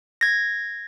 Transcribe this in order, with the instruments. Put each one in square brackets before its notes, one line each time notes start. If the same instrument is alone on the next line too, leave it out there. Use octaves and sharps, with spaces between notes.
[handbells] G#6 A#6